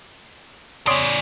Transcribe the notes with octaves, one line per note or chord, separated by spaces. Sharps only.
C#3 C#5 D5 C6 D#6